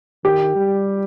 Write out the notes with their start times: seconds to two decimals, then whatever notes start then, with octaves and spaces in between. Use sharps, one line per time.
0.24 D#3 G4
0.56 G3